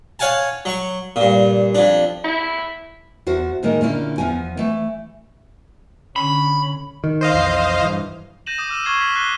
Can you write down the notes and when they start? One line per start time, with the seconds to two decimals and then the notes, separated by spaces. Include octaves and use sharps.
0.19 C#5 F5 F#5 G#5 A5
0.65 F#3 C#6
1.16 G2 A#2
1.75 F2 D4
2.24 E4
3.27 E2 F#4 C5
3.63 A2 D#3 G#3 A#3
3.81 A#2 D3 C#4 E4 F4
4.18 E2 F3 B3 G#5
4.57 E3 A3
6.16 D3 C#4 B5
7.04 D#3
7.21 C5 D#5 F5
7.33 B1 F2 E3
7.82 G2 E3
8.46 G6 A#6 D#7 E7 F#7
8.58 D6 D#6 G6
8.70 D6 E6 F6 D#7 E7
8.85 C#6 F6 G#6 C7 E7 G7
8.99 F6 B6 F#7
9.16 F#6 C7 D#7 G7